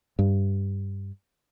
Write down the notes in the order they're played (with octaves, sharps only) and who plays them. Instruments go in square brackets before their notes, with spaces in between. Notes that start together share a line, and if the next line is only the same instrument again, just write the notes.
[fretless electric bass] G2